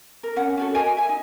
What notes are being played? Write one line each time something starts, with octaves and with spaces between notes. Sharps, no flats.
A#4
C#4 A#4 F#5
C#4 F#4 A4
F#4 A#4 D#5 G#5
E5 G#5
D#4